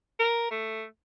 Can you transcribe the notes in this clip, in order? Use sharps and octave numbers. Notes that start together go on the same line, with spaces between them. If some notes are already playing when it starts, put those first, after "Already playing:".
A#4
A3